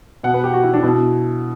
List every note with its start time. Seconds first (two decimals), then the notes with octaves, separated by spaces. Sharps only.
0.23 B2 F#5
0.34 B4
0.44 G4
0.54 F#4
0.63 E4
0.74 D4
0.83 B2 E4